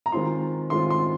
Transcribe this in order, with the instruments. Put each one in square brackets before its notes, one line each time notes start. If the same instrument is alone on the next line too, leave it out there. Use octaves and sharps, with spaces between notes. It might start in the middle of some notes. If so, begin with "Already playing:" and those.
[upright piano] A#5
D#3 G#3 C4 F4 C6
D#3 G#3 C4 F4 C6
C6